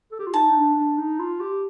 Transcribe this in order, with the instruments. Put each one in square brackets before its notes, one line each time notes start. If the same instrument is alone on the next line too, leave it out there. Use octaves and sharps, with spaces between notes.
[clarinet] A4
G4
F4
[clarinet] D#4 [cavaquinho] A5
[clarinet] D#4
D4
D4
D#4
F4
G4